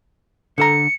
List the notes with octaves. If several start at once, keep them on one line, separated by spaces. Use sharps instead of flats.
D3 A4 A#5 C#7